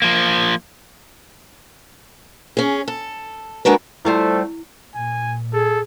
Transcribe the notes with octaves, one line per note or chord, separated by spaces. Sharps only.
F3 A#3
C#4 G#4
A4
G#3 D4 F#4 A#4 B4
F3 G3 A3 C4 E4
A#2 G#5
G#4 A4